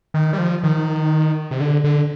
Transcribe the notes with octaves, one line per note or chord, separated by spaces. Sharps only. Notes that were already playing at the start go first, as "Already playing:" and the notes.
D#3
G3
F3
D#3
C3
D3
D3